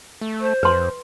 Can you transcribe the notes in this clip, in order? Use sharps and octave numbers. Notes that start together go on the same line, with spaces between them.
A3
C5
F2 B4 C6